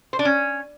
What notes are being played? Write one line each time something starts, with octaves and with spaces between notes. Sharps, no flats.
C5
D4
C#4